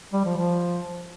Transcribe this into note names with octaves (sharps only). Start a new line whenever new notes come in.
G3
F3
F3